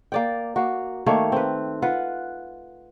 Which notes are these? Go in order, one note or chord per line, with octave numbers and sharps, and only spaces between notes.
A#3 D5 G5
A#3 F#4
D#3 A3 A#3 C#5
C4 B4
F4 B4 F#5